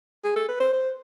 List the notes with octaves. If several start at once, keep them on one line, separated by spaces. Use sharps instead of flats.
G#4
A4
B4
C5
C5